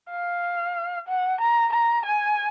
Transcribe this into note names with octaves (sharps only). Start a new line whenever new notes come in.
F5
F#5
A#5
A#5
G#5